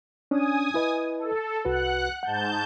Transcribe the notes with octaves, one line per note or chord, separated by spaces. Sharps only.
C#4 D4 G#5 D#6
E4 B4 D#5
A4
C2 F#4 B4 F#5 F#6
G#2 F#5 A5 G6